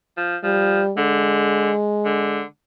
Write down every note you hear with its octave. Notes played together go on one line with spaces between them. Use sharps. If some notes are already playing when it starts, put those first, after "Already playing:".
F3
F3 G3
D3 G#3
D3